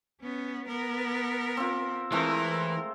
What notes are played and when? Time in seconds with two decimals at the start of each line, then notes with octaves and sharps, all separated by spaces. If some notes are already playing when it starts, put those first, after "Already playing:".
0.21 B3 C#4
0.68 B3 A#4
1.57 C4 F4
2.12 E3 G#3 A3 C4 A#4